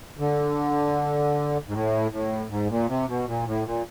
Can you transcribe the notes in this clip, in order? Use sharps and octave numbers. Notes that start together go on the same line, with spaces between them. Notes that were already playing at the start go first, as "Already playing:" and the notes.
D3
G#2
A2
A2
G#2
A#2
C3
B2
A#2
A2
A#2